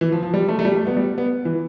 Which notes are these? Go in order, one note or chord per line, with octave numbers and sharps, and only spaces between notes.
E3
F3
F3
G3
A3
A3
G3
A3
B3
G3
B3
E3